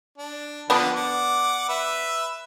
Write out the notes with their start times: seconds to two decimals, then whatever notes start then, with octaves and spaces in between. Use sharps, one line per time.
0.18 D4
0.70 D3 F3 B3 D4 B4
0.95 F#5 D6
1.69 B4 E5